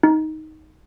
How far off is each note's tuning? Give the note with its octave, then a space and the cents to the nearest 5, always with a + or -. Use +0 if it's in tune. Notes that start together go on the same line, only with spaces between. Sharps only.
D#4 +10